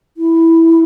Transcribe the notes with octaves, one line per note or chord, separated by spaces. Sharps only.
E4